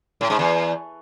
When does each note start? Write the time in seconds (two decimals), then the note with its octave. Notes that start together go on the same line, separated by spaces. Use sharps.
0.21 A2
0.30 G#2
0.39 E2